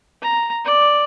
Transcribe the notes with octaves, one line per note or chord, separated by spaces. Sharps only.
A#5
D5